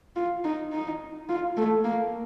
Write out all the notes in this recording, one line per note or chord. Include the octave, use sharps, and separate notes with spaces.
F4
D#4
D#4
F4
A3
A#3